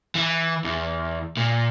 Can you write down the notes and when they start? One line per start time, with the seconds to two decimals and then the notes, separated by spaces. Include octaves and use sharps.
0.15 E3
0.64 E2
1.37 A#2